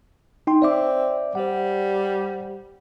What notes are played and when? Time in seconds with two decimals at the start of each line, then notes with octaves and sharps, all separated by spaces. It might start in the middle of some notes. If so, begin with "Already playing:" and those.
0.47 D#4 G5 C6
0.62 C4 D5 E5 D6
1.35 G3 C5 F#5